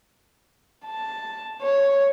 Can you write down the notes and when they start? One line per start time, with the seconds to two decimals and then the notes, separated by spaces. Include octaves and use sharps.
0.86 A5
1.62 C#5